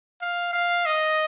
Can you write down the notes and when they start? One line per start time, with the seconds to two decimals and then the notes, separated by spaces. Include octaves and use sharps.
0.22 F5
0.53 F5
0.86 D#5